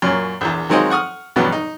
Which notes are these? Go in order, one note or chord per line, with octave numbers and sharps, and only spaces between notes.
F#2 A#2 C#4
A#1 E2
D#3 F#3 G#3 C4 D#4 F4
F#5 C#6 D#6 F6
E2 G2 B2 F#3 B3
D#4